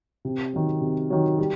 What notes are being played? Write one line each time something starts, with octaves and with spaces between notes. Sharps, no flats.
C3
D#3 F#3
C3
D#3 F#3
G3